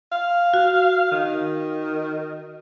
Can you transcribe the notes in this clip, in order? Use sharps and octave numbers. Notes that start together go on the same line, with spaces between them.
F5
F#4
D#3